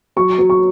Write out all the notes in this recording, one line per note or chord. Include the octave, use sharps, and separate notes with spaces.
F#3 C#6
F#3
C#6